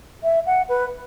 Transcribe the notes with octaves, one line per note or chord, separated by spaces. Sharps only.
E5
F#5
B4